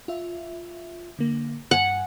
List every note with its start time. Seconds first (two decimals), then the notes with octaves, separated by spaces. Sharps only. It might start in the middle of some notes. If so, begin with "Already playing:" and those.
0.08 F4 E5
1.19 D3 A#3
1.71 G2 F#5 G#5